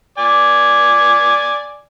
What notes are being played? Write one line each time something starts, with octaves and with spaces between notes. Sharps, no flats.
D5 G#5